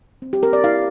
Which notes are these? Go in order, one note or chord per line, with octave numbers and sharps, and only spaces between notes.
C4
G4
C4 A#4
D5
E4 F5